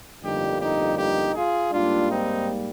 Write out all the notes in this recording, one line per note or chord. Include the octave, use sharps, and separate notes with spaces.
G1 F2 D3 G3 A#3 D#4 G4
D#4 G4
D#4 G4
F4 G#4
G#2 G3 A#3 D4 F4
C4 D#4